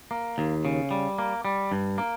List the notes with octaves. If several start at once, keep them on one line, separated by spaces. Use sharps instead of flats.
A#3
D#2
C#3
G3
A#3
G3
G2
A#3